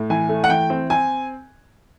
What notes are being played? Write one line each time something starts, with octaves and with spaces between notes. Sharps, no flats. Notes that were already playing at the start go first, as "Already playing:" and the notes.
Already playing: A2
E3 G#5
A3
F#5
E3 G5
C4
C4 G#5